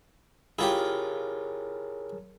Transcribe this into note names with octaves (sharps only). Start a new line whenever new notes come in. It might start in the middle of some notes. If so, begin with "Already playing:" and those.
E4 F4 G4 G#4 A#4 C#5